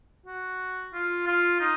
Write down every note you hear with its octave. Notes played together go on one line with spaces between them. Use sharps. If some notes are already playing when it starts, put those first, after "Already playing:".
F#4
F4
F4
D#4